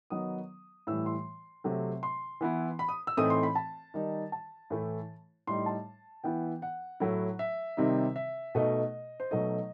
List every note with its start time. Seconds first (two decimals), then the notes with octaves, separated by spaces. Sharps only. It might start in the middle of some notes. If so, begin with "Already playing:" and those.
0.10 D#3 F#3 B3 D#4 D#6
0.87 A2 E3 G3 E6
1.06 C6
1.64 C3 F#3 A3 C4
2.03 C6
2.41 E3 B3 E4
2.79 B5
2.89 D#6
3.07 E6
3.17 A2 E3 A3 C4 D#4 D#6
3.30 C6
3.43 B5
3.55 A5
3.94 D#3 G3 D#4
4.32 A5
4.70 A2 E3 A3 E4
5.47 A2 G3 D#4 C6
5.66 A5
6.24 E3 B3 E4 G5
6.62 F#5
7.00 A2 F#3 A3 E4
7.39 E5
7.77 C3 D#3 G3 C4 D#4
8.16 E5
8.55 B2 A3 D#4 D#5
9.20 C5
9.31 B2 F#3 A3 D#4 D#5